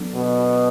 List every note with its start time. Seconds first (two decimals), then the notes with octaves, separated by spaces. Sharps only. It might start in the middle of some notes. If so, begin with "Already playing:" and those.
Already playing: F#3 B3 D4 A4
0.15 B2